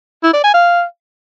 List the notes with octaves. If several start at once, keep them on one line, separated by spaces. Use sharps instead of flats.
E4
D5
G#5
F5